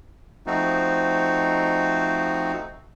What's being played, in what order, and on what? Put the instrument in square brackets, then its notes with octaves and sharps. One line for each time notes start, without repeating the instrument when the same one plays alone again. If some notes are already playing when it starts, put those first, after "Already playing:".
[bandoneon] F3 A3 C4 D#4 F#4